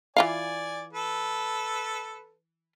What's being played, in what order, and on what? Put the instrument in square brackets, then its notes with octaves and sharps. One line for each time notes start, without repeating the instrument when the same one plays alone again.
[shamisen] E3 F4 F5 [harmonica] D5 G#5
[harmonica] A4 B4